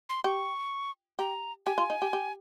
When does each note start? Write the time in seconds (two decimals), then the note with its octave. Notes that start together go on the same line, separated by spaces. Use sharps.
0.09 C6
0.24 G4 C#6
1.19 G4 A#5
1.66 G4 G#5
1.78 F4
1.90 D#4
2.02 G4
2.13 G4